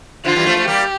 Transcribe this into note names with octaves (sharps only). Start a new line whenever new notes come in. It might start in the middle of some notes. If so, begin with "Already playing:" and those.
D3 F3 F4
E3 G3
F3 A3
F3 A3
G3 A#3 G4